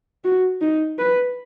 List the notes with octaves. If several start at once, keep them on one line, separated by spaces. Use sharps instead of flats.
F#4
D#4
B4